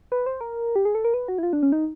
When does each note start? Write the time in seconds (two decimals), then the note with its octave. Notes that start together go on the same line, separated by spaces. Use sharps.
0.12 B4
0.26 C5
0.41 A#4
0.76 G4
0.85 G#4
0.95 A4
1.04 A#4
1.14 B4
1.28 F#4
1.38 E4
1.43 F4
1.53 D4
1.63 C#4
1.72 D#4